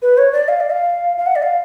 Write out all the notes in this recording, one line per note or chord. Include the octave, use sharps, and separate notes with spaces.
B4
C#5
D5
F5
D5
F5
F5
F#5
D5
F5